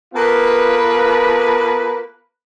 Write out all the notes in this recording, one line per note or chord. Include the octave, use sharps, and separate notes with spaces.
A#3 B3 F4 A4 B4